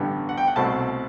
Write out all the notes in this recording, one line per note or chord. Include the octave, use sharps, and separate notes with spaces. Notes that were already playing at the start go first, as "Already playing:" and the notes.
Already playing: A1 G2 D3 G3 B3
F#5
G5
F#5
C2 B2 A3 C4 A5